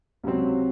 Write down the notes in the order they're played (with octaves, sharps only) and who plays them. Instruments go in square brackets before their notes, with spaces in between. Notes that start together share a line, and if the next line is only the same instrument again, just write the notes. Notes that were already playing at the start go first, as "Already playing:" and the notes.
[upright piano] C#2 C3 F#3 C4